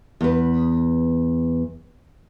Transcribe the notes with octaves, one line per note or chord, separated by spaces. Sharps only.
E2 B4